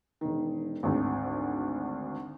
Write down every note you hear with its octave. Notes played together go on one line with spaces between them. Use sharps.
E1 D#3
G#1 D2